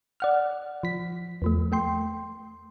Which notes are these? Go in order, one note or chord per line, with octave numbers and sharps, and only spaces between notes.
D5 F#5 F6
F3 B6
E2 F3 A3
A3 G5 C6